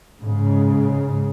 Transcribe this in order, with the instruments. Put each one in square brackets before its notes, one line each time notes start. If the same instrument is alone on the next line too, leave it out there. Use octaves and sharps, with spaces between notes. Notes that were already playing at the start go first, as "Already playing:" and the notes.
[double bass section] G#2 C#3